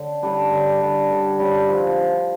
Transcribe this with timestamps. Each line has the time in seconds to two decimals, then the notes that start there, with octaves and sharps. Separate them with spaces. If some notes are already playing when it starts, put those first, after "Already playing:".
Already playing: D3
0.23 G3 D4 A4
0.51 D3
0.81 G3 D4 A4
1.11 D3
1.39 G3 D4 A4
1.68 F3